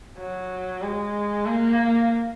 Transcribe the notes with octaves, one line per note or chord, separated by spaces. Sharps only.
F#3
G#3
A#3